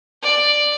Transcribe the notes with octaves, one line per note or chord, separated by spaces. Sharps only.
D5